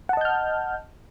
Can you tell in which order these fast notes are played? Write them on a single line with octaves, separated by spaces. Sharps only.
F#5 A5 D#5 G6 F6